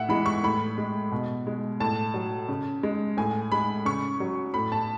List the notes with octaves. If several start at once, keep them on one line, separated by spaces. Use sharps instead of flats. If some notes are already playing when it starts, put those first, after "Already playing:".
Already playing: A2 E5 F#5
E3 G#3 B5
C#6
A2 B5
G#3
B2
G#3
A2 A5
F#3
C#3
G#3
A2 G#5
G#3 B5
C#3 C#6
F#3
A2 B5
A5